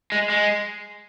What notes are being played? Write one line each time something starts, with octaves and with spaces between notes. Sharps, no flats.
G#3
G#3